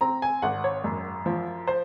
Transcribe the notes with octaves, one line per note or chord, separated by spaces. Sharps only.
C4 A#5
G#5
G#1 F#5
C#5
F#2
F3
C5